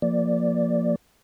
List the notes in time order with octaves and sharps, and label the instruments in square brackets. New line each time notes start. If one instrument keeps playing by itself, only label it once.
[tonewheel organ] F3 A#3 D5